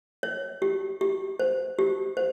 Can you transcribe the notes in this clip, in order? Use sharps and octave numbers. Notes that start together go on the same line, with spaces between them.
C#5
G4
G4
C5
G4
C5